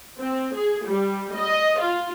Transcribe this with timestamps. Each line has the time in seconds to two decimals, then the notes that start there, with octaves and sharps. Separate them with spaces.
0.19 C4
0.55 G#4
0.87 G3
1.35 D#5
1.80 F4